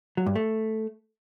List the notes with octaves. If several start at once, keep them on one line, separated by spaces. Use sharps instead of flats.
F#3
G2
A3